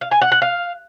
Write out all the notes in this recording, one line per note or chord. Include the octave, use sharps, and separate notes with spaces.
F5
G#5
F#5
F#5
F5